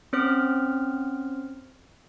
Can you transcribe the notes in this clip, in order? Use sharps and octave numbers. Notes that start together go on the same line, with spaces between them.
C4 C#4 C5 F6